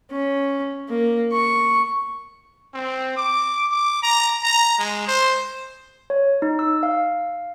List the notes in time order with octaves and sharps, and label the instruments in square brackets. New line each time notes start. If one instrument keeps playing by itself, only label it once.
[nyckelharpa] C#4
A#3
C#6
[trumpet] C4
D6
D6
A#5
A#5
G#3
C5
[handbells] C#5
D#4
E6
F5